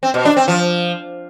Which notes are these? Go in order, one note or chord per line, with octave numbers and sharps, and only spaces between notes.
C4
B2
D4
C4
F3